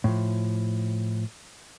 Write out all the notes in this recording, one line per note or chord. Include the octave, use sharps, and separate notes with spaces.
A2 F3